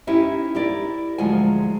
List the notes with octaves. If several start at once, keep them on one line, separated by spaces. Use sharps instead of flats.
C#4 D#4 E4 G4
E4 G4 A#4 D5
D2 F3 F#3 G#3 F4 G#5